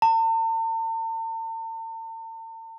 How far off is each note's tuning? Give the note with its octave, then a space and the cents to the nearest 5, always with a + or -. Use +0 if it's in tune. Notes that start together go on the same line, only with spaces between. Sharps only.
A5 +45